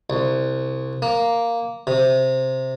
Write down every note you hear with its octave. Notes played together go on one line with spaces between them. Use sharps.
C2
A#3
C3